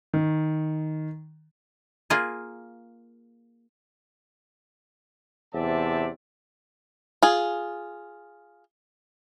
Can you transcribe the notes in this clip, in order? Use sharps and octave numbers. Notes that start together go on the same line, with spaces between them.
D#3
A#3 F4 G#4
E2 C3 C5 D5 E5 A5
F4 G#4